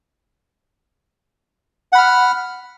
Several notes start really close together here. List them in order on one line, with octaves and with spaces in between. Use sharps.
F#5 B5 F6